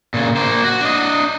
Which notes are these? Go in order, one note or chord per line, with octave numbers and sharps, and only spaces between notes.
A#2 C#3
A#3 C5
F#4
D4 D#5